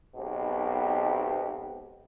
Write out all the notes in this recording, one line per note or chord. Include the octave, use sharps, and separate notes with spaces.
B1 G#2 B2 C4 G4